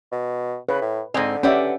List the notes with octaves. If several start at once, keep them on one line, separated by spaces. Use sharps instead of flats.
B2
C#3 B4
A2
G#2 D3 C4 D#5 G#5
C#4 G4 B4 D5 E5 F#5